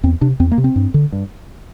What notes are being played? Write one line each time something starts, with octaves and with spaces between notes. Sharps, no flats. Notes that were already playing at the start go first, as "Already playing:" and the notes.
E2 C4
C3 D4
E2 C4
A#3
C3
C4
G2
D3
G2